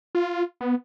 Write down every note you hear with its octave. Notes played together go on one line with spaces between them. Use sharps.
F4
B3